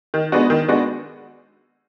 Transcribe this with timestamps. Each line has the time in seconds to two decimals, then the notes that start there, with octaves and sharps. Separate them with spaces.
0.14 D#3
0.32 G#3 B3 D4 F#4
0.50 D#3
0.68 G#3 B3 D4 F#4